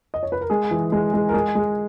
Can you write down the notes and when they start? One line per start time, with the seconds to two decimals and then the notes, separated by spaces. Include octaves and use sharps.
0.14 D#5
0.23 C#5
0.32 B4
0.41 A#4
0.50 G#3 G#4
0.71 E3
0.92 G#3
1.13 G#3
1.29 A#4
1.34 G#3 G#4
1.55 G#3